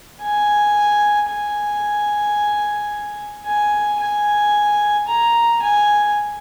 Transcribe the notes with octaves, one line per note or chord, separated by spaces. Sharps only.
G#5
G#5
G#5
G#5
A#5
G#5